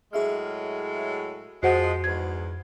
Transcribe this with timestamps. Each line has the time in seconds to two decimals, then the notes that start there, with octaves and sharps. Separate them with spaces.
0.13 A2 F#3 G#3 G#4 E5 F6
1.63 F2 F3 G#3 F#4 C5 F#5
2.04 E2 G#2 G#6